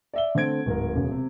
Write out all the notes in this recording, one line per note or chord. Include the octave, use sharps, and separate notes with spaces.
D5 E5 G7
D3 A3 C4 G#6 D7
D1 G#2 A#4
E1 C#3
C3